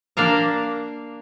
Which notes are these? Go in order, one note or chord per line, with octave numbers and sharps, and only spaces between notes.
A#3 D4 F5 A#5